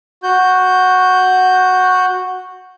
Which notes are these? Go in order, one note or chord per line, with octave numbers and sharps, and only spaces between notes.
F#4 G6